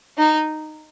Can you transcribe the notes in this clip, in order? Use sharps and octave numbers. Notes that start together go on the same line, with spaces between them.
D#4